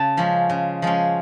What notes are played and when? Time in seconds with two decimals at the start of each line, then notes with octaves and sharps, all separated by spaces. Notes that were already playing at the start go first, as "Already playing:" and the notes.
Already playing: C#3 A5
0.17 F3 G#3 C#4
0.50 C#3
0.82 F3 G#3 C#4